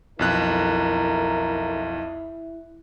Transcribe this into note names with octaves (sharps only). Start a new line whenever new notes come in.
B1 F2 E4 A#4 F#6